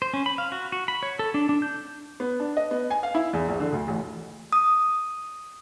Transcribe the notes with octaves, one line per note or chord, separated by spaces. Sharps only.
C5
C#4
B5
F5
F#4
F#4
B5
C#5
A4
D4
D4
G6
B3
D4
D#5
B3
G#5
F5
E4
E2
A#1
D3
D2
A1
D#6